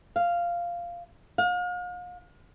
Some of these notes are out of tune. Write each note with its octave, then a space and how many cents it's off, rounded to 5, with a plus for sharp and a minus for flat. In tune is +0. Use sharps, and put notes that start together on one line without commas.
F5 -10
F5 +40